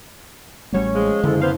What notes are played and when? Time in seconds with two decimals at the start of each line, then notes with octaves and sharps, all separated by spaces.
0.73 A1 F#3 G3 A3 C#4 C#5
0.94 F3 G#3
1.24 F#1 D3 A4
1.41 B3 C5 F5